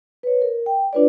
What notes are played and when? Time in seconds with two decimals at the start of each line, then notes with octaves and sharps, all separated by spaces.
0.23 B4 C#5
0.42 A#4
0.66 G5
0.93 D4 F4 B4 C#5 D5